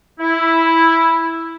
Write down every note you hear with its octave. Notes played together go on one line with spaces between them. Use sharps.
E4